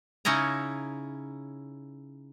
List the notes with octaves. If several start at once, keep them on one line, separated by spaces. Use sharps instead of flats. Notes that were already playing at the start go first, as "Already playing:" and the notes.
C#3 C#4 D#4 E4 A#5